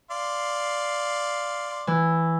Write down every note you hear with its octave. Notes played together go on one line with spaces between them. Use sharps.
D5 F5 C6
E3